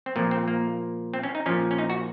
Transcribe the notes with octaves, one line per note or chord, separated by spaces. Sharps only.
C4
A#2 F3 A#3
C4
A#3
C4
C#4
D#4
A#2 F3 C#4
C#4
D#4
F#4